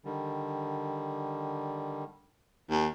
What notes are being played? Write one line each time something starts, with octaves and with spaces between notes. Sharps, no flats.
D3 D#3 G3
D#2